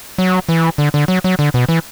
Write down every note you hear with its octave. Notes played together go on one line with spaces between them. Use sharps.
F#3
E3
D3
D3
F#3
F#3
D3
B2
E3